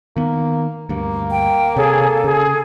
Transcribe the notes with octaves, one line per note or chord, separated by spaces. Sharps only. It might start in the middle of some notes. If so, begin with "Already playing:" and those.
D#3 A#3 B3
D2 G2 A#3
G5
C3 G#4 A4 C#5
C#3 G#4